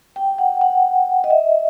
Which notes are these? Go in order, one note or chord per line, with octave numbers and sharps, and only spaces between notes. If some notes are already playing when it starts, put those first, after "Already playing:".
G5
F#5
F#5
D#5
E5